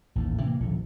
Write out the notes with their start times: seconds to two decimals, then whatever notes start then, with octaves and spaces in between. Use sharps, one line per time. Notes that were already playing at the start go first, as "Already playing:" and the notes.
0.15 A1 D#2 A2
0.42 C3 E3 A#3
0.60 D#1 A#1 D3 F3